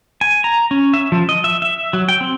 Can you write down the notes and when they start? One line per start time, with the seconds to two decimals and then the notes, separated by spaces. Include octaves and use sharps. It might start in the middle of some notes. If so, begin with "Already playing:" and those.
0.21 G#5
0.44 A#5
0.71 C#4
0.94 E5
1.12 F3
1.29 D#5
1.44 E5
1.62 E5
1.93 F#3
2.09 G5
2.21 C4